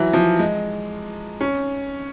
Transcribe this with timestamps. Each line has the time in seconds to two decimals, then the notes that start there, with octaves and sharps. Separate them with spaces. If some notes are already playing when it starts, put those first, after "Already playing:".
Already playing: E3 F#3
0.13 F3
0.39 G#3
1.41 C#4